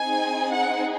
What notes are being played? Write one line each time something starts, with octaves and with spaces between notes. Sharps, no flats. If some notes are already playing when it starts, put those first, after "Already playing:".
Already playing: C4 D#4 G#4 G#5
F#5